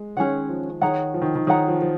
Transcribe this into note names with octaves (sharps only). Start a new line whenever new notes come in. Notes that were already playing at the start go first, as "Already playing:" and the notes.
Already playing: G#3
D#3 C#4 G#4 C#5 F#5
F3
D#3 G#4 C#5 F#5 A#5
F3
D#3
D#3
D#3 G#4 C#5 F#5 A#5
F3
F3